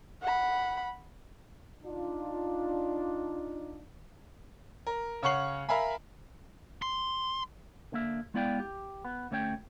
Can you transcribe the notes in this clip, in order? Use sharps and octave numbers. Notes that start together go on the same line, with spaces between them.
F#5 B5
D4 D#4 F4
A#4
C#3 C#5 F#5 C#6 C7 F#7
A#4 E5 F5 G#5 B5
C6
D3 A#3 E5
G#3 B3 E4 D5 F5 G5
G4
B3
D2 A3 C#4 C#5 G5